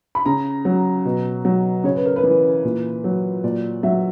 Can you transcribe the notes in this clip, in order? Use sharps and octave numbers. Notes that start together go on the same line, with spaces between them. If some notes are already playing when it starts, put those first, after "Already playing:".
B5
C#3 A#5
F#3
B2
F#3
C#3 C#5
B4
A#4
B4
E3
A#2
F#3
A#2 D5
F#3 E5